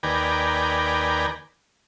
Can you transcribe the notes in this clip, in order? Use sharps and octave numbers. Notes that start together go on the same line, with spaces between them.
D#2 B4 D5 G5 G#5 A#5